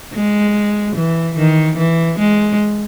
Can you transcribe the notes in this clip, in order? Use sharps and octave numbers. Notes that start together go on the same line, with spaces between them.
G#3
E3
D#3
E3
G#3